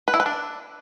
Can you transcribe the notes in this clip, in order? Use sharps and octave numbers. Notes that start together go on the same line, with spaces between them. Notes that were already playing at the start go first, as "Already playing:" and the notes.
B4
E4
B4
D4